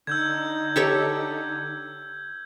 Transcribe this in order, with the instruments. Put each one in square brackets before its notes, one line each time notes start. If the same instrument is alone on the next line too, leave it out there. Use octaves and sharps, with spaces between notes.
[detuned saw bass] D3 [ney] D#4 [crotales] E6 G6 G#6
[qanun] G4 A4 C#5